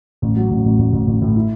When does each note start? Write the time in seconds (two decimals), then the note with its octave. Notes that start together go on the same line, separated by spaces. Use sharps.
0.22 A1
0.36 F#3
0.51 A1
0.65 A1
0.79 A1
0.93 A1
1.07 A1
1.22 A2
1.36 E4